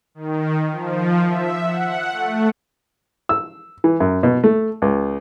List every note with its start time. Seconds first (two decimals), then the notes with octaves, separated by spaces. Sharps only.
0.15 D#3
0.71 F3
1.26 E5
1.63 F#5
2.12 A3
3.29 E6
3.84 E3
4.00 F#2
4.23 B2
4.44 A3
4.82 C#2